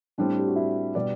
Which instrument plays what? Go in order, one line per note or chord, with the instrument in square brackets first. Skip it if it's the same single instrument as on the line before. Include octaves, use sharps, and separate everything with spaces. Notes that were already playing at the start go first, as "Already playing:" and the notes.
[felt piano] A2 G3 C4 [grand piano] D4
[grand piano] G4
F#4
E4
[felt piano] B2 G3 [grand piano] D5